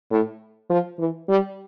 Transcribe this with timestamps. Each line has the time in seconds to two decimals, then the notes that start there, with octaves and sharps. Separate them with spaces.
0.11 A2
0.70 F3
0.99 E3
1.29 G3